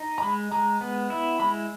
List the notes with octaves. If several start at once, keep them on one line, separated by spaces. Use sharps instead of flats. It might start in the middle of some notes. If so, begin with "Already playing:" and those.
Already playing: D#4
A#5
G#3 B5
G#3 A#5
B3
E4
G#3 B5